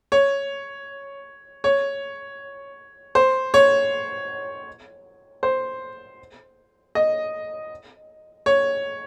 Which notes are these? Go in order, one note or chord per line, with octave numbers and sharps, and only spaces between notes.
C#5
C#5
C5
C#5
C5
D#5
C#5